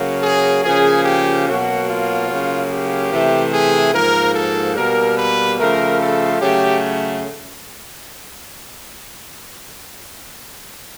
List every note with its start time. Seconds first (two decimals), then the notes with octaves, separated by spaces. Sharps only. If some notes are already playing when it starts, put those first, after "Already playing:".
Already playing: C#3 F#3 A#3
0.22 G#4
0.64 C#3 F3 A#3 G#4
1.04 G4
1.46 B2 F#3 A#3 F#4
1.88 F4
2.29 C#3 F#3 A#3
2.70 G4
3.11 C3 E3 A3
3.53 G#4
3.93 G#2 F3 A#3 A#4
4.34 A4
4.76 B2 G3 A#3 A#4
5.17 B4
5.58 C#3 F3 A3 A#4
6.00 A4
6.40 C#3 F#3 A3 G4